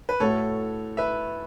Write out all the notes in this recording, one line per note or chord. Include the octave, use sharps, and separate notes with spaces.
B4
A2 A3 F#4 A4 C#5
B4 E5